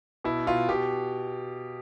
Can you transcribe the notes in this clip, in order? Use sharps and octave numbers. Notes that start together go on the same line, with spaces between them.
B2 E4
B2 F4
B2 G4